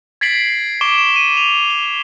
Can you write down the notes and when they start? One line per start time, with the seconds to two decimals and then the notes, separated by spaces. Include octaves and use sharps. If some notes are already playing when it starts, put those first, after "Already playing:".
0.21 G#6 A6 B6 C7 D7 F#7
0.81 C#6 D6 D7 E7 G7
0.98 E7
1.16 D#7
1.37 F7
1.70 G7